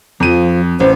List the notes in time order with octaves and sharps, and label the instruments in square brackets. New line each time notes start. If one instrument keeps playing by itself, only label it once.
[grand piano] F2 D#7 [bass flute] F3
[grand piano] A1 [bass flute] C5